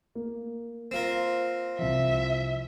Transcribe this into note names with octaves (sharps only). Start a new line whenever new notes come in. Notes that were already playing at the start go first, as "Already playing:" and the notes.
A#3
C4 F4 A#4
C2 F3 E5